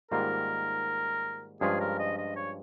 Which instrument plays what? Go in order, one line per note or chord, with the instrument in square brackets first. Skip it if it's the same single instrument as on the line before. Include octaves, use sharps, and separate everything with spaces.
[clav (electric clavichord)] G#2 D#3 G3 A#3 F4 [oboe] A#4
[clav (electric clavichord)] G2 F3 G#3 C#4 F4 [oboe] G#4
[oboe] A#4
D#5
D#5
C#5